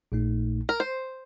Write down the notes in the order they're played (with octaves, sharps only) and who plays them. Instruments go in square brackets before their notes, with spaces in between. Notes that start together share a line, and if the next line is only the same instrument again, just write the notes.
[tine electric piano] A#1 A#2 A3 D#4
[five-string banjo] A#4
C5